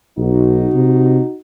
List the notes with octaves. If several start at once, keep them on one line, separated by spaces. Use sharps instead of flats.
B1 D#4 F#4
C3